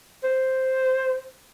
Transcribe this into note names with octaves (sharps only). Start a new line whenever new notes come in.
C5